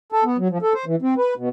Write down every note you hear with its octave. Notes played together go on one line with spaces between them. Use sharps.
A4
B3
F#3
F3
A4
C5
E3
C4
B4
B2